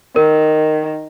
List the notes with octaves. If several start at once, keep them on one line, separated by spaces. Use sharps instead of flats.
D#3 A#4